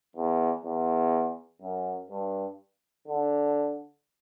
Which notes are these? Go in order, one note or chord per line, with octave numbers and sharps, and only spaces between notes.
E2
E2
F#2
G2
D3